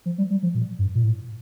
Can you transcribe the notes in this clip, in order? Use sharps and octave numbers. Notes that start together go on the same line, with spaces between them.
F3
G3
G3
F3
A#2
G2
A#2
A2